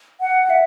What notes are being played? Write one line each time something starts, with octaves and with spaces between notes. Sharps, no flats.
F#5
E5